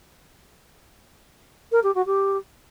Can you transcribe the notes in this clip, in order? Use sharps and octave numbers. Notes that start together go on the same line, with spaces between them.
A#4
G4
F#4
G4